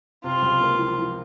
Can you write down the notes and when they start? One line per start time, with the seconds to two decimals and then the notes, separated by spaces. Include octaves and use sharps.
0.24 C3 F4
0.42 C#2
0.61 A#3
0.79 F3
0.98 F3